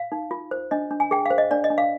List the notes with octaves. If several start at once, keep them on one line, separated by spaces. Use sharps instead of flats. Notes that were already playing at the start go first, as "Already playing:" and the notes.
Already playing: F5
D#4
F4
C5
D4 D#5
D4
G#5
G#4 G5
C5 F5
D#5
D4 D5
D#5
D4
F5